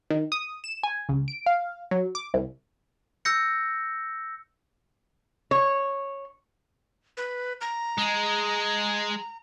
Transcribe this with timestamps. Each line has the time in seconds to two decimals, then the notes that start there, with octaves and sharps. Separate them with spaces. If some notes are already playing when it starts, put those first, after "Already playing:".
0.11 D#3
0.32 D#6
0.64 E7
0.83 G#5
1.09 C#2
1.28 D7
1.46 F5
1.91 F#3
2.15 D6
2.34 C2
3.25 E6 G6 A#6 C#7
5.51 C#5
7.17 B4
7.61 A#5
7.98 G#3